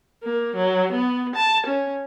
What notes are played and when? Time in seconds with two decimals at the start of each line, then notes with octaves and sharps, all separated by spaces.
0.23 A#3
0.56 F#3
0.93 B3
1.35 A5
1.66 C#4